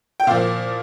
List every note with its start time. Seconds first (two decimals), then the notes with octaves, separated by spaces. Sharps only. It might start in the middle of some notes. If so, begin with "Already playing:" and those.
0.20 G5
0.27 A#2 F3 F5